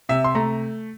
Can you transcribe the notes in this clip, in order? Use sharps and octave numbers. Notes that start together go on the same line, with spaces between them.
C3 E5
C6
A3 A#5